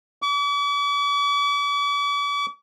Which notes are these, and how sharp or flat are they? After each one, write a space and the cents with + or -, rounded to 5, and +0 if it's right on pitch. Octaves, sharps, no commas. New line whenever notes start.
D6 -45